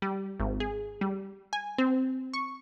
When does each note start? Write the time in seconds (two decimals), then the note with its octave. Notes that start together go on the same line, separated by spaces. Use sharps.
0.02 G3
0.40 G#1
0.60 G#4
1.01 G3
1.53 G#5
1.78 C4
2.34 C#6